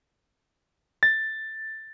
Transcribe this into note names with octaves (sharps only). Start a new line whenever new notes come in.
A6